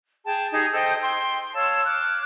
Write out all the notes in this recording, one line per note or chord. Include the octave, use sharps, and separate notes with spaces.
G#4 G5 A5
D#4 G4 G#4 G#5
A4 C5 D#5 G5
G5 C6
C#5 F5 A5 E6
D6 F6 F#6